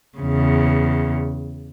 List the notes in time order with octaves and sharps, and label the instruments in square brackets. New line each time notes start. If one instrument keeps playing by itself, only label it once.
[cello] E2 C#3